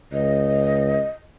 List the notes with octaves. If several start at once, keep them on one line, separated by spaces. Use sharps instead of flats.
C#2 D#5